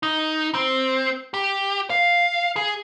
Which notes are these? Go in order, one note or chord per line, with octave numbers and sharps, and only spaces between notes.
D#4
C4
G4
F5
G#4